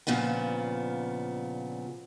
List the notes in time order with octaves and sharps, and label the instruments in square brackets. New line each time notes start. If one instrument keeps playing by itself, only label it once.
[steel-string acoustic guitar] G2 A#2 C#3 F3 B3